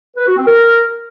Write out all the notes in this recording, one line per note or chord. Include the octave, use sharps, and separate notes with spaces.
B4
F#4
C4
A#4